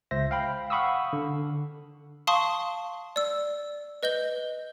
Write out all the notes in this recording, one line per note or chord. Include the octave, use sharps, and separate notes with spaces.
C#2 C5 E5 A#6
F5 G5 B5
F5 F#5 B5 C#6 D#6 E6
D3
F5 A5 C6 C#6 D#6
D5 E6
B4 D#5 G6 G7